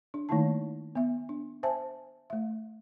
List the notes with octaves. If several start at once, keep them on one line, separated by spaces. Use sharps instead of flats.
D4
D#3 A3 A#3 D#4 E4 A5
B3 E5
D4
C5 E5 G#5 A5
A3 E5